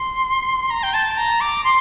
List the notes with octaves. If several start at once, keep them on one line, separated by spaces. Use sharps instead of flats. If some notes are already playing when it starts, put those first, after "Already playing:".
Already playing: C6
A#5
G5
A5
A#5
D6
C6